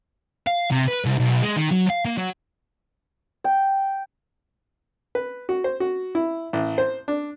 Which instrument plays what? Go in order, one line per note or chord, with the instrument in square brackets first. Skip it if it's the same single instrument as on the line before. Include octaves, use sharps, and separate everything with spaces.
[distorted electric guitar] F5
C3
B4
C2
B1
G#3
D#3
F#3
F5
A#3
F#3
[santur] G5
[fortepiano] B4
F#4
C5
F#4
E4
A1
C5
D4